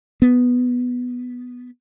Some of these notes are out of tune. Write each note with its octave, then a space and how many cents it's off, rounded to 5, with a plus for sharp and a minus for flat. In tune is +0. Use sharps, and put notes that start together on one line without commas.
B3 +0